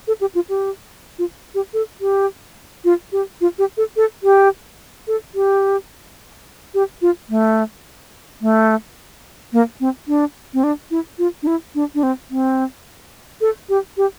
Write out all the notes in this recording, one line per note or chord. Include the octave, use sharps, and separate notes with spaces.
A4
G4
F4
G4
F4
G4
A4
G4
F4
G4
F4
G4
A4
A4
G4
A4
G4
G4
F4
A3
A3
A#3
C4
D4
C4
D4
E4
F4
D4
E4
D4
D4
C4
C4
A4
G4
G4